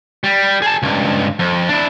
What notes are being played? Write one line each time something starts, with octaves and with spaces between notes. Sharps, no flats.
G3
G#4 A5
C#2 G2
F2
D4 E4